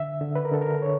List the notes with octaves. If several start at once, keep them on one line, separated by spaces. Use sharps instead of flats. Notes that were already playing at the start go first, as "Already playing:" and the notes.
Already playing: D3 E5
D3
B4
A#4
D3 A4
A#4
D3 C#5